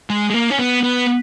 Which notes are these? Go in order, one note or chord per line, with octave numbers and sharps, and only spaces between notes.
G#3
G#3
A#3
C#4
B3
B3